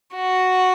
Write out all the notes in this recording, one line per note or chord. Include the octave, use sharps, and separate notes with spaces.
F#4